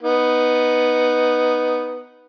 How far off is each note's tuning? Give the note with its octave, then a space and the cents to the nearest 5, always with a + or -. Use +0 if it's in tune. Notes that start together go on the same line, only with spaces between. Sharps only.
B3 +0 D#4 +0